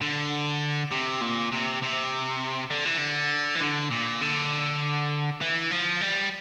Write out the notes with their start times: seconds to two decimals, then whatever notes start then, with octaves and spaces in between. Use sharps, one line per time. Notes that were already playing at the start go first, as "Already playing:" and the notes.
0.02 D3
0.91 C3
1.21 A#2
1.52 C3
1.82 C3
2.71 D3
2.85 E3
2.98 D3
3.55 E3
3.61 D3
3.91 A#2
4.22 D3
5.41 E3
5.71 F3
6.01 G3